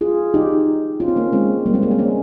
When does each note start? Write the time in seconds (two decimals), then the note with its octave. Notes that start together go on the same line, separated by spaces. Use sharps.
0.01 F4 G#4
0.34 D#4 G4
1.00 C#4 F4
1.08 C4
1.16 A#3 C#4
1.32 G#3 C4
1.66 G3 A#3
1.74 G#3 C4
1.82 A#3 C#4
1.91 G#3 C4
1.99 A#3 C#4